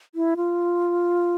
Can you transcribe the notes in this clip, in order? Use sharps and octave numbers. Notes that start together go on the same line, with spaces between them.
E4
F4